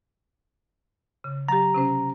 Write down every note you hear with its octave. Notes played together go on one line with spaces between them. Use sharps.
C#3
F#3 G4 A#5
C3 C#4 C5